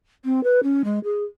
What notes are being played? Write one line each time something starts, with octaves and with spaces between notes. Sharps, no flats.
C4
B4
C#4
G#3
G#4